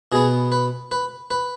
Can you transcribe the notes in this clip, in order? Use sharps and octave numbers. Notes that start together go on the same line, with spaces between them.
B2 B3 G#4
B4
B4
B4